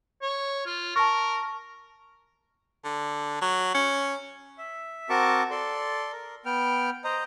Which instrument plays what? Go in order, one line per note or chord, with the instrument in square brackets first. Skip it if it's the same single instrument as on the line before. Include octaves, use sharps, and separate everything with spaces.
[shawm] C#5
F4
[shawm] A#4 [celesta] A5 C#6
[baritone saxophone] D3
F#3
C#4
[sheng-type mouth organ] E5
C4 F#4 A#4 A5 C#6 D6
A4 D5 C6
A#4
B3 G5 F6
C5 D#5 A#5